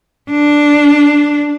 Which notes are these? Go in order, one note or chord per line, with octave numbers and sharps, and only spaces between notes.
D4